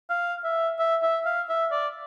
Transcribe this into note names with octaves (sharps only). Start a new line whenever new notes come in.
F5
E5
E5
E5
F5
E5
D5